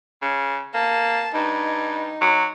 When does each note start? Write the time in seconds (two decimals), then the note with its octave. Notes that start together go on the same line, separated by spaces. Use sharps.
0.22 C#3
0.74 A#3 A5
1.35 G2 D#4
2.21 F#3